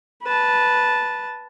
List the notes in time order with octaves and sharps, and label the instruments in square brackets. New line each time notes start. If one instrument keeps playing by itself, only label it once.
[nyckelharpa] B4 A5